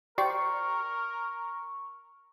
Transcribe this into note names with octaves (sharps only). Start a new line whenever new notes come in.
G4 A#4 C5 D5 C#6